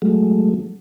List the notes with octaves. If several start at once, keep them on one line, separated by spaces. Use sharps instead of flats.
F#3 G#3 A3